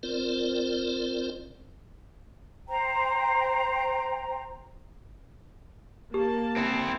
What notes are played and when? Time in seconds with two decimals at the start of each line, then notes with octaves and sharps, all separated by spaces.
0.03 C4 F4 A#4 C5 D5
2.68 C5 G5 A#5
6.14 A#3 G4 A5
6.56 C4 E4